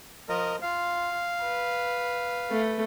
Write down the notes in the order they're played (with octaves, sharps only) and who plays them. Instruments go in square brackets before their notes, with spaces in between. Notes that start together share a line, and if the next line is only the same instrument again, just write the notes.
[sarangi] F3 [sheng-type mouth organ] A#4 D#5
[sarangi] F4 [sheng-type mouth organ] F5
[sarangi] B4
[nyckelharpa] A3